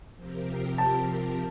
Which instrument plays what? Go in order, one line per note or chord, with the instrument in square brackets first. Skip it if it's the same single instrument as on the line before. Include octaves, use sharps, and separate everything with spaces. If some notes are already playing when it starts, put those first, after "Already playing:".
[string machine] C3 F3 C4 G4 A#4
[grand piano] A5